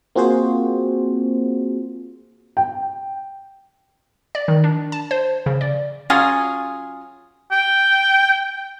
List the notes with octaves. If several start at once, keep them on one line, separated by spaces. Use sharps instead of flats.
A#3 C4 F4 F#4 G#4 C5
G5
D5
D#3
D4
A5
C5
C#3
D5
F#3 C#4 F4 G#4
G5